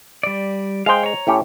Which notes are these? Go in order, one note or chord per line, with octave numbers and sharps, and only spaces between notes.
G3 D5
G#3 C5 F5 G5
C#5 A#5
A2 C#4 G4